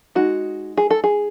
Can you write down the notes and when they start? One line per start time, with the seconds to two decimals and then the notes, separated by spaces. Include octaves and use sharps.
0.15 G#3 D#4 F#4
0.77 G#4
0.90 A4
1.04 G#4